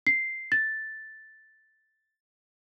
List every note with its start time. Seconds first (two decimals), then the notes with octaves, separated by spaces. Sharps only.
0.07 C7
0.52 A6